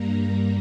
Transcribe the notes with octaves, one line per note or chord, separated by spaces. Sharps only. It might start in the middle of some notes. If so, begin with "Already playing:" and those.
Already playing: G2 G3 A#3 A#5
A#5